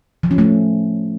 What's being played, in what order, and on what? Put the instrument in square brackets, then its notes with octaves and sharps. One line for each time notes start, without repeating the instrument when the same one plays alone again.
[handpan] F3
C#4
A3